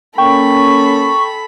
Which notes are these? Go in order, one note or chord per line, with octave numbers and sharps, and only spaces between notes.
A#3 C#4 A4 G5 B5 C#6